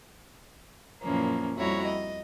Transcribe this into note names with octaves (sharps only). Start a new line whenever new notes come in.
F#2 A#2 E3 F3 A#3 C#4
F2 G3 E4 F#4 C#5 A#5
D#5